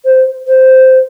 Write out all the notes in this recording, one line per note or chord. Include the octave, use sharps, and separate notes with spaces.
C5
C5